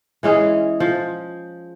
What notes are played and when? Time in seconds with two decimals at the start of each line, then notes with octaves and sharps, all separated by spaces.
0.23 E3 G#3 C#4 G#4
0.80 F3